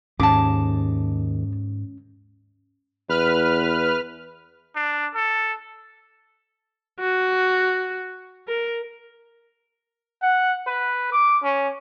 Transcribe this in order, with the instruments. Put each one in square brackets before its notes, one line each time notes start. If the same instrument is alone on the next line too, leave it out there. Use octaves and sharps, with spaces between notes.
[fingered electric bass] D#2 [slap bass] G#2 [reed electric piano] C#4 [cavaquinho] A5 D6
[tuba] E2 [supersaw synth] B4 F6
[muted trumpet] D4
A4
[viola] F#4
A#4
[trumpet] F#5
B4
D6
C#4